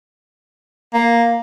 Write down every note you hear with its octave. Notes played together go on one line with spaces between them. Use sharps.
A#3